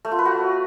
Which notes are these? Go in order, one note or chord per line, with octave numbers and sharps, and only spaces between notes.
A3
F4
B4
F#4